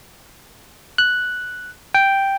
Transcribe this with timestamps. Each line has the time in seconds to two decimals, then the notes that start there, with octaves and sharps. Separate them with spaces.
0.98 F#6
1.94 G5